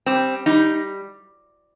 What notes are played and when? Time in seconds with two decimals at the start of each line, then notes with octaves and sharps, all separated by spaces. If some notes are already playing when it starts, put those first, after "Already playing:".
0.06 G3 C4
0.46 G3 D#4